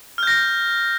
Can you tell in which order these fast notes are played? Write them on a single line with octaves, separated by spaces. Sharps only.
F6 G6 A#6